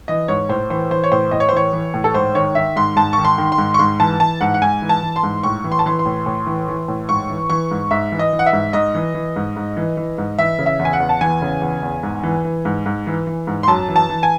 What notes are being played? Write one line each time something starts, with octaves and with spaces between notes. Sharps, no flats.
E3 D#5
G#2 C#5
A2 C5
E3 C5
E3 C5
C#5
A2 C5
A2 D#5
C#5
C5
E3 C#5
E3
A2
A4
G#2 C5
D#3 C#5
D#3 E5
G#2 C6
G#2 A5
D#3 C#6
C6
D#3
C6
G#2
C#6
G#2 C6
E3 A5
E3 A5
G#2 F#5
F#5
G#2 G#5
E3
A5
E3
C6
G#2
A2 C#6
E3
C6
A5
E3 C6
C6
A2
A2
E3
E3
A2
G#2 C#6
E3
E3 C#6
G#2
G#2 E5
E3
D#5
E3
F#5
E5
G#2
G#2 D#5
E3
E3
G#2
G#2
E3
E3
G#2
E3 E5
C#3
E5
E2
G#5
F#5
E2
A5
E3 G#5
C#3
E2
E2
G#2
E3
E3
G#2
G#2
E3
E3
G#2
C6
F#2 A5
E3
A5
E3
G#5